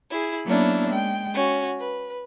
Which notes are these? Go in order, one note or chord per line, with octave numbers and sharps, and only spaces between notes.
E4 G#4
F#3 A#3 B3 C#4 D4 E4
G#3 G5
C#4 F#4
B4